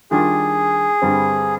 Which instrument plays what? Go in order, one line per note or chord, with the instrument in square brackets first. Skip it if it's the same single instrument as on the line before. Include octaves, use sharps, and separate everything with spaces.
[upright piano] D#3 G3 D4 F4 A#4 [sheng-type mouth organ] G#4
[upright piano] G2 D3 G3 C4